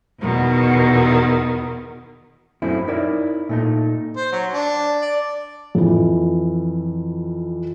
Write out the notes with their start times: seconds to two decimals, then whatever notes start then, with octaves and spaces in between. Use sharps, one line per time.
0.19 E2 B2 D#3
2.62 F#2 A3 C4 C#4 E4
2.88 D#4 E4 A#4 C#5 D5
3.49 A#2 A3 D#4
4.16 C5
4.32 F#3
4.53 D4
5.02 D5
5.75 F2 E3